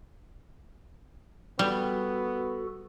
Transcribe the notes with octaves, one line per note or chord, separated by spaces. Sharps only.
G3 B3 F#4 A4